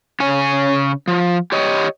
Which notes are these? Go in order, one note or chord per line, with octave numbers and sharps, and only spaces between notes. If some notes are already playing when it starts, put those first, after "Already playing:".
C#3 C#5 G#5
F3
G4 C#5 D#5